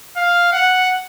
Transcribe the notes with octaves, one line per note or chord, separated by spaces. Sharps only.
F5
F#5